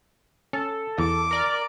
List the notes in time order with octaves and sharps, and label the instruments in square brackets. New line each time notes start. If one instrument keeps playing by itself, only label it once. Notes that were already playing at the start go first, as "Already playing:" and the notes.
[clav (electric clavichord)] C#4 [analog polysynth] A4
[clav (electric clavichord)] E2 [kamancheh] D6
[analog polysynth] A#4 D5